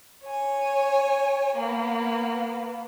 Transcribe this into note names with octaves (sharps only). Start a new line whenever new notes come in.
C#5 G#5
A#3 B3